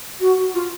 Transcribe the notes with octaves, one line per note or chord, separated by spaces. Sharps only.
F#4
F4